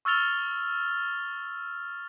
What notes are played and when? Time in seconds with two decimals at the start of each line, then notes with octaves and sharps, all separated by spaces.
0.05 C#6 E6 F6 A6 F7 G7